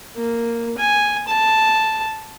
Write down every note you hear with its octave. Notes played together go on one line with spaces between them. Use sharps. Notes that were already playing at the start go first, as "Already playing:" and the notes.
A#3
G#5
A5